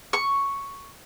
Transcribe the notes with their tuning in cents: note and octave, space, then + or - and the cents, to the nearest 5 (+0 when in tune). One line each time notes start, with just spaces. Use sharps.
C#6 +0